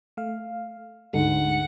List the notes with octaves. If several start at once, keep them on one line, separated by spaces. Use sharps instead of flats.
A3 F5
D2 G#2 G#3 F#5